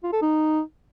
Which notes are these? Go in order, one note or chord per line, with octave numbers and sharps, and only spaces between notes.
F4
A4
D#4